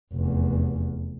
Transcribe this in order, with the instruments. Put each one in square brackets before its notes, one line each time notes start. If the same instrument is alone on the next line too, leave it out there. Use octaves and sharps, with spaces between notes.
[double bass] F1 E2